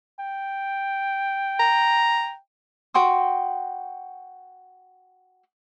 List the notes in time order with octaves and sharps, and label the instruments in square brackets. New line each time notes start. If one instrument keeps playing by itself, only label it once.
[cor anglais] G5
[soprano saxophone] A#5
[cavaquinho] F#4 G5 C6 D#6